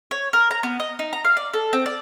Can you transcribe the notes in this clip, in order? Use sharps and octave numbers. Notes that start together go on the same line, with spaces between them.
C#5
A#4
A#5
B3
D#5
D#4
A#5
F5
D5
A4
C4
D5